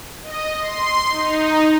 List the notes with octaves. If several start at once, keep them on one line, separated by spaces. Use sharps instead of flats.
D#5
C6
D#4